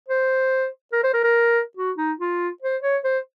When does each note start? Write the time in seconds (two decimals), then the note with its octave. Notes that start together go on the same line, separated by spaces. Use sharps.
0.08 C5
0.92 A#4
1.04 C5
1.13 A#4
1.24 A#4
1.77 F#4
1.98 D#4
2.20 F4
2.62 C5
2.82 C#5
3.04 C5